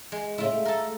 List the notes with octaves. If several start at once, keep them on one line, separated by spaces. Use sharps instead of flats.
G#3
A2 C#3 A3 E4 F4
A3
A4 A#4